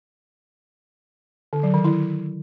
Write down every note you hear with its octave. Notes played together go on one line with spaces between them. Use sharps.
D3
F#3
D#3
E4